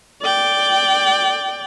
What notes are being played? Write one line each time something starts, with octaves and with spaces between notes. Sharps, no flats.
D5 G5